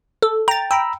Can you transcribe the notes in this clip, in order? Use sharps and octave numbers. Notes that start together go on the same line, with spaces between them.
A4
G5 A#5 A6
G5 A#5 B5 E6